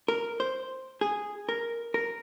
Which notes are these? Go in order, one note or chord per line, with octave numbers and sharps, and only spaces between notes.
A#4
C5
G#4
A#4
A#4